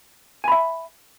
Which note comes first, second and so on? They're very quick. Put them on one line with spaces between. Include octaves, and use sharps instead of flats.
G#5 B5 E5